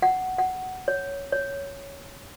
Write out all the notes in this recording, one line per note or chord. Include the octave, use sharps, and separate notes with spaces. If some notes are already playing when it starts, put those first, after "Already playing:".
F#5
F#5
C#5
C#5